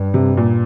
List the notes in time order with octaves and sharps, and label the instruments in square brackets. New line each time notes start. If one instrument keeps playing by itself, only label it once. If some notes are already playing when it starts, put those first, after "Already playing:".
Already playing: [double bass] G2
[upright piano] C3
A#2